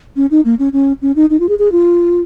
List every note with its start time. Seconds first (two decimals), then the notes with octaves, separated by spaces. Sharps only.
0.16 C#4
0.31 D#4
0.45 A#3
0.59 C#4
0.73 C#4
1.02 C#4
1.16 D#4
1.30 D#4
1.40 F4
1.49 G#4
1.59 G#4
1.72 F4